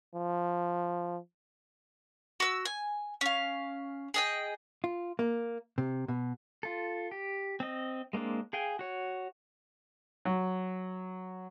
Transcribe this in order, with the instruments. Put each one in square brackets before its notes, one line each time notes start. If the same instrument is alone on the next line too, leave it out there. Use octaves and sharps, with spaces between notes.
[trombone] F3
[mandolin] F#4 E6
G#5
C#4 F5
G#4 D#5 G5
[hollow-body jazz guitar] F4
A#3
C3
B2
[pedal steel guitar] F4 A4
G4
C4 D#5
G#3 A#3 C4 D4
G#4 F5 G5 G#5
F#4 C#5
[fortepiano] F#3